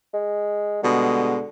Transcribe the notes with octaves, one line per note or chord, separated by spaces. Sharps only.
G#3
B2 D3 G3 G#3